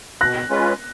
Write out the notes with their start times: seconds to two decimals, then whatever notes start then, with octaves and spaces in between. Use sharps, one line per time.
0.21 B2 F#6 A#6
0.50 G#3 C#4 F4 B4